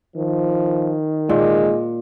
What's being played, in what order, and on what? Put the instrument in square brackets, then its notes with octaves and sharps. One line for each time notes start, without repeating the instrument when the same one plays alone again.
[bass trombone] D#3 [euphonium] F3
[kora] A#2 [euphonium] G#3